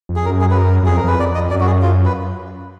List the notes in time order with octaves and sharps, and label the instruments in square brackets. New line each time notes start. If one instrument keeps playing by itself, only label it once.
[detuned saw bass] F2
[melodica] G#4
[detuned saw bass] F#2 [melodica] A#4
[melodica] G#4
B4
A#4
[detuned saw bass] F#2
[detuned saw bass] F2 [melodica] G#4
[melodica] A#4
[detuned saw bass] F2 [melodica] B4
[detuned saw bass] F2 [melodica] D5
[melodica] D#5
[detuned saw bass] F#2 [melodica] D5
[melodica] F#4
G#4
F4
B4